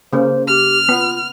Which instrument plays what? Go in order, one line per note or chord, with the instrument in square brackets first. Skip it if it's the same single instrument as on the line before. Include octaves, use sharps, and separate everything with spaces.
[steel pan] C#3 A#3 [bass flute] C5
[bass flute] G4 [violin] F6
[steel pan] B3 [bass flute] F4